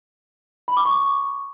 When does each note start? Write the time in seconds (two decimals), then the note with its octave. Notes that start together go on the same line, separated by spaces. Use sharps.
0.68 B5
0.77 D6
0.85 C#6